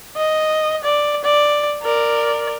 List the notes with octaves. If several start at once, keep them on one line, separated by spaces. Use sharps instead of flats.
D#5
D5
D5
A#4 D5